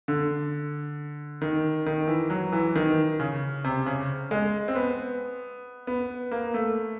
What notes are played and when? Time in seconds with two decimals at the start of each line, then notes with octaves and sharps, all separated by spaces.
0.08 D3
1.42 D#3
1.86 D#3
2.08 E3
2.30 F#3
2.52 E3
2.75 D#3
3.20 C#3
3.64 C3
3.86 C#3
4.31 G#3
4.68 C4
4.76 B3
5.87 B3
6.31 A#3
6.54 A3